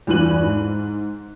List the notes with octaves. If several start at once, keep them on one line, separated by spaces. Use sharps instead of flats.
E2 G2 E3 F#6 D#7 F#7
G#2